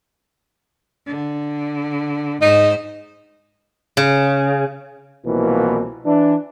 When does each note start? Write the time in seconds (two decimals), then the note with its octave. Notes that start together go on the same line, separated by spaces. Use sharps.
1.07 D3
2.41 G#2 D#4 C5
3.97 C#3
5.25 C2 B2 E3 F3 A#3
6.05 E3 D4